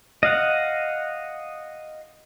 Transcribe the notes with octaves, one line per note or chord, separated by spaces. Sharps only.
D#5 F5 F#5